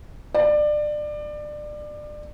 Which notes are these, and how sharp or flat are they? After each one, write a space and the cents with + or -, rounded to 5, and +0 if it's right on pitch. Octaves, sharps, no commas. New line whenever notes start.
D5 +25